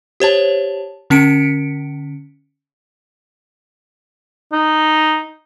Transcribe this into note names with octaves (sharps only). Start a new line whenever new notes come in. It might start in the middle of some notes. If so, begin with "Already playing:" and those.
G4 C5 C#5 A5
D3 C#4 B6 C#7 D7
D#4